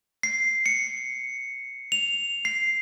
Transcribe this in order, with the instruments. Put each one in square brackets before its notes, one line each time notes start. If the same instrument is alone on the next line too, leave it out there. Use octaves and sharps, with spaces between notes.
[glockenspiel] C7
C#7
F7
C7